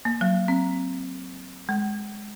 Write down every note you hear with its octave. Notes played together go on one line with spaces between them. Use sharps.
A#3
F#3
C4
G#3